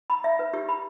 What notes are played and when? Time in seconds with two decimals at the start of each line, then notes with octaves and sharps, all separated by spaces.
0.10 B5
0.24 E5
0.39 B4
0.54 G4
0.69 B5